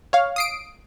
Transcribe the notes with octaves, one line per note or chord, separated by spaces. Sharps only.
C#5 F5
D#6 C7 D7